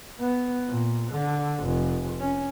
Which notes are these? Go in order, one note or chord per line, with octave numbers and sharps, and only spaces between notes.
B3
A#2
D3
F1
C#4